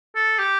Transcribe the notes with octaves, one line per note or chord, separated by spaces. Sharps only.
A4
G4